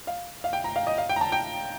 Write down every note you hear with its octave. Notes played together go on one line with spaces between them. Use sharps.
F5
F5
G5
A#5
F5
D#5
F5
G5
A#5
A5
G5